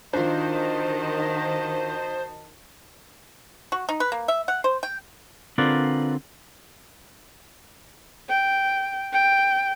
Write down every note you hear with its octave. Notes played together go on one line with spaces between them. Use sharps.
D#3 D4 F4 F#4 C5 D#5 A5
F#4
D#4
B4
A#3
E5
F#5
C5
G5
D3 C4 F4 A#4 B4 D5
G5
G5